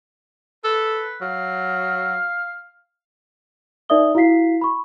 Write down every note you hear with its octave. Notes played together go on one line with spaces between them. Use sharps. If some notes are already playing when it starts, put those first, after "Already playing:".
A4 B4
F#3 F5
D#4 A#4 D5 E5 D#6 G7
E4 F#4 F5 B6 C7
B5 C#6